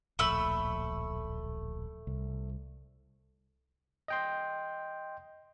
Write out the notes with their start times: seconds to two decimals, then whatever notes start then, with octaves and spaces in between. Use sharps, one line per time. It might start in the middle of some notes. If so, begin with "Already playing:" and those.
0.19 D1 A#1 A3 B5 E6
2.07 C2
4.08 D#5 G5 C6